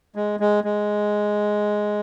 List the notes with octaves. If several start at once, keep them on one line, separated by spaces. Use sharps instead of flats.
G#3
G#3
G#3